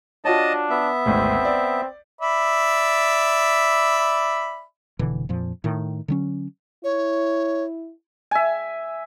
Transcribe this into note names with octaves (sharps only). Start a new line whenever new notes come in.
D4 F4 F#4 C#5 D#5 A5
B3 E5
G#1 D2 C4
D5
D5 E5 B5
F1 B2 D3 E3
F2 A#2 F3
A2 D#3
D3 F#3 C#4
E4 C#5
E5 G#5